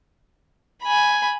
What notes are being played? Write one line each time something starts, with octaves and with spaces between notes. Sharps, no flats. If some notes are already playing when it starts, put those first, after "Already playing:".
G#5 B5